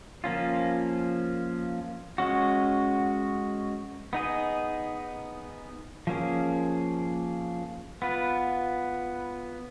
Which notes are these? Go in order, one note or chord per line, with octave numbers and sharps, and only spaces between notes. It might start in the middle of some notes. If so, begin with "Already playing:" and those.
F3 A#3 C#4 F4
G#3 C#4 F#4
B3 D#4 G#4 D#5
F3 A#3 C#4 G#4
B3 F4 B4